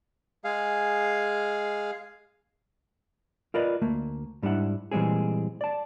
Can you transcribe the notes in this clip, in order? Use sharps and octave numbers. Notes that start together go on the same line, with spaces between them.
G#3 G#4 F5
F4 A#4 B4 D5 D#5
D2 A3 A#3
G#2 G3 D4 E4 F#5
A#2 E3 G3 G#3 C4 G#4
D5 A5